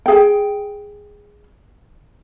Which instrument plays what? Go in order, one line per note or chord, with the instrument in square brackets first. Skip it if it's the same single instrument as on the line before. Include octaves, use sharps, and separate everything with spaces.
[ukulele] G#4 G5